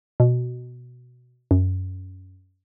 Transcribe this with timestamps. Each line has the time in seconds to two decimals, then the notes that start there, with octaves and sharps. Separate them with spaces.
0.20 B2
1.51 F#2